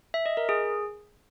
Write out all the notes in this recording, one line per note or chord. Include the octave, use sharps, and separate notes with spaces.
E5
D#5
A#4
G#4